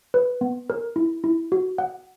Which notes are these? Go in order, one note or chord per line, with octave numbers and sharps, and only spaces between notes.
B4
B3
A#4
E4
E4
F#4
F#5